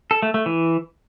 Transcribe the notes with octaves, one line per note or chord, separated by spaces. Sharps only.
A4
A3
A3
E3